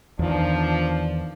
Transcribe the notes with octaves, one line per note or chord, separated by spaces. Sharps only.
E2 D#3 F3 D4